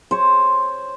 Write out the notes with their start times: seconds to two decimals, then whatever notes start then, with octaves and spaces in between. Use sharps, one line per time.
0.11 C5 C#5